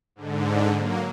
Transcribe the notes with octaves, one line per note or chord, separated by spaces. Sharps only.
G#2 D3
F#3 A#3